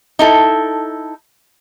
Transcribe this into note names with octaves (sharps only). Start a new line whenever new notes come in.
D#4 E4 A4